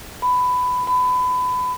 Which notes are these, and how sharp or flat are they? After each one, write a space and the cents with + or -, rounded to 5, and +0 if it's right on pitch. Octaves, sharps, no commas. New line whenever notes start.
B5 +15
B5 +25